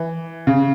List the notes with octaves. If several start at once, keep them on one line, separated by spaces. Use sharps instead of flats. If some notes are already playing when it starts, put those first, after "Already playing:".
Already playing: E3
C#3